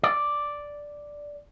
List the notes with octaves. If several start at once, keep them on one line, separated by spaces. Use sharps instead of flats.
D5